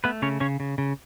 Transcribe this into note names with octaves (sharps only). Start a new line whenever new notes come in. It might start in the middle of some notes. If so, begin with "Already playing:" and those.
A3 B3 B4
C#3 C#4 C#5
C#3 C#4 C#5
C#3
C#3